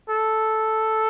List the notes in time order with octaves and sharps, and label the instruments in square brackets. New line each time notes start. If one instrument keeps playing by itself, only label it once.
[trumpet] A4